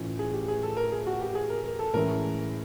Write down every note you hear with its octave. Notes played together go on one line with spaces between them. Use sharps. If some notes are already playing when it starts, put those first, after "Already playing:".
Already playing: A2 E3 A3 C#4 F4
G#4
G4
G#4
A4
A#4
G#4
F#4
G4
G#4
A#4
A#4
A4
A2 E3 G#3 C#4 E4 A#4